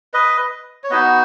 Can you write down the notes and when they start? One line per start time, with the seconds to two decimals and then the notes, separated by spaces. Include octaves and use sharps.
0.14 B4 D#5
0.84 C#5
0.90 B3 D#4 F#4 B4 D#5